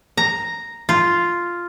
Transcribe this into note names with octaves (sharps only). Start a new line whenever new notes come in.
A#5
F4